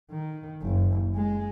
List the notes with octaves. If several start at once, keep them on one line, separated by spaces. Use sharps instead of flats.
D#3
F#1
G#3